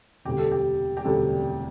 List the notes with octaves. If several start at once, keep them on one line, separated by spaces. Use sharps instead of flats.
E1 D2 C3 G3 G4
A4
G4
G4
E1 D2 C3 G3 A4